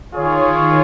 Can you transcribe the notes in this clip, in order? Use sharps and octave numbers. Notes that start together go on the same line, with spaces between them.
D#3 F4 G#4 C#5